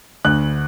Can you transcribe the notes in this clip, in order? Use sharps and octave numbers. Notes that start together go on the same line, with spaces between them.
D2 F#6